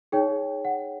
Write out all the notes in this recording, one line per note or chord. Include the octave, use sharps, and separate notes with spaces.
D#4 G#4 C#5 G5
F#5